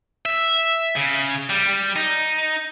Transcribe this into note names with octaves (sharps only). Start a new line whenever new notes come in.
E5
C#3
G3
D#4